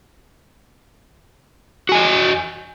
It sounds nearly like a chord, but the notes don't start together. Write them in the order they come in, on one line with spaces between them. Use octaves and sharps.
F#4 G#5 D#5